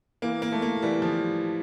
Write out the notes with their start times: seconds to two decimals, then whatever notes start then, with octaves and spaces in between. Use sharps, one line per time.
0.22 E3 A#3
0.42 A#3
0.52 A3
0.62 A#3
0.82 E3 G3
1.02 F3